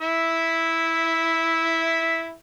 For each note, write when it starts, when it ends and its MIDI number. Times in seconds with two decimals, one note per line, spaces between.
0.02 2.35 64
0.02 2.35 76